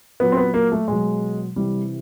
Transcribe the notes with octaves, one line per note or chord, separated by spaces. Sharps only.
A#2 F#3 B3
C4
B3
A#3
A3
B2 F#3 G#3
C3 E3 G3